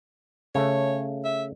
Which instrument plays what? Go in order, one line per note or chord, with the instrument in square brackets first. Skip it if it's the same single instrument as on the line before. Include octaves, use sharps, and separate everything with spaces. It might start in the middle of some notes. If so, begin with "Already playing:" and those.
[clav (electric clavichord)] C#3 A3 [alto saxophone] C#5
[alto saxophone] E5